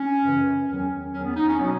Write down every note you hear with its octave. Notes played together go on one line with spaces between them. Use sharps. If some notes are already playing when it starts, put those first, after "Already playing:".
Already playing: C#4
F#2 C#3 E3
E2 D#3 F#3 C#4
E2 D#3 F#3 C#4
B3
D#4
C#4
B2 F#3 B3